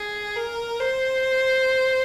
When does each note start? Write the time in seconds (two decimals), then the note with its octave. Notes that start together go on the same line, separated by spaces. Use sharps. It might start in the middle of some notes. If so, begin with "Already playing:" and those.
Already playing: G#4
0.36 A#4
0.80 C5